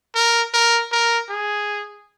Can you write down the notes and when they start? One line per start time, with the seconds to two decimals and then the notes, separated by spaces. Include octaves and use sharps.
0.15 A#4
0.54 A#4
0.92 A#4
1.29 G#4